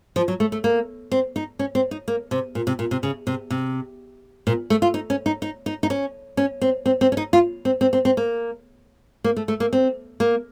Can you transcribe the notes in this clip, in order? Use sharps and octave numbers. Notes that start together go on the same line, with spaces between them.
F3
F#3
A3
A3
A#3
C4
D#4
C#4
C4
D#4
A#3
C3
A#2
C3
A#2
C3
C#3
C3
C3
A#2
A3
F4
D#4
C#4
D#4
D#4
D#4
D#4
C#4
C#4
C4
C4
C4
C#4
D#4
F4
C4
C4
C4
C4
A#3
A#3
A3
A3
A#3
C4
A#3